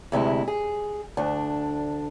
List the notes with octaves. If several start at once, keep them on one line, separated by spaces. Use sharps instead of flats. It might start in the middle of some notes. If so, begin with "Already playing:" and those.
D2 C3 G#3 E4
G#4
D2 D4